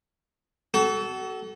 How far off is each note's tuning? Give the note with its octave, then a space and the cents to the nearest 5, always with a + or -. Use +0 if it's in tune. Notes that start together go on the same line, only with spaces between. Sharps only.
F#4 +35 A4 -15